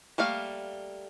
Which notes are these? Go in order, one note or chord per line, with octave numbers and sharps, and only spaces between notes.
G3 A3 A#3 F5